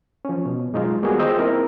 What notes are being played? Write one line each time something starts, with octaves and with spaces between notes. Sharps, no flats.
F3 C#4
B2
F#2 G#3 D#4 F4
D#3 G3 A#3 B3 F#4 G#4
F4 G#4 C5 D#5 G5 E6
A#3 C4 D#4 E4 A#4